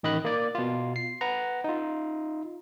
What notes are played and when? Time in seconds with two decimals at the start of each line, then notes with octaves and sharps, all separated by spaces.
0.03 A1 D#3 D#5 B5 F#6
0.25 A#3 D5
0.55 B2 F4
0.96 C7
1.21 B4 F#5 A#5
1.64 D#4 F4